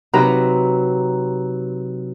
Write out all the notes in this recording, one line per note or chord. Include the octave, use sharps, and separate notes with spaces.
C3 F#3 D#4 B4 A#5